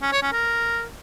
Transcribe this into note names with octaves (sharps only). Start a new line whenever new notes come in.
C#4
C#5
C#4
A#4